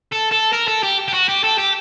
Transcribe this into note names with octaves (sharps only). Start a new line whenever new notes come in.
A4
A4
A#4
A4
G4
G4
F#4
G4
A4
G4